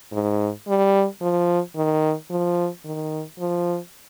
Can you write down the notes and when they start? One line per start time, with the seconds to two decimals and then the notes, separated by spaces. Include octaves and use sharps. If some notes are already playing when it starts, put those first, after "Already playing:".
0.12 G#2
0.67 G3
1.22 F3
1.76 D#3
2.30 F3
2.85 D#3
3.39 F3